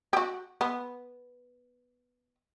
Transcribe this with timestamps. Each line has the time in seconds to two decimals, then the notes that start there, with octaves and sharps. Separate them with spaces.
0.13 F#4 G4
0.61 B3